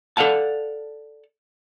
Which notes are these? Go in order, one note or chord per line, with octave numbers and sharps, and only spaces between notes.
A4 D5 F5 F#5 A5